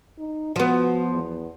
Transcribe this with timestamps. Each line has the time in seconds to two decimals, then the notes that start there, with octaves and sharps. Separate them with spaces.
0.18 D#4
0.56 F3 B3 F#4
1.12 E2